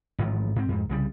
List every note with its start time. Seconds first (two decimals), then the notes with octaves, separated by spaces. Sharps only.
0.19 A1 G#2 D#3 F3
0.56 G#2 C4
0.69 F2 G#2
0.89 C2 C#3 G3